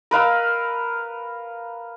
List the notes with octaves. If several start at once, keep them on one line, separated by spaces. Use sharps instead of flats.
A#4 B4 F5 E6